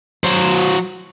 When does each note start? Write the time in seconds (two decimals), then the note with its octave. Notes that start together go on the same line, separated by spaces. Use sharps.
0.24 F#3 C5